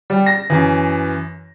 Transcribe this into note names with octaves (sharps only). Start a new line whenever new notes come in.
G3
A#6
F#2 E3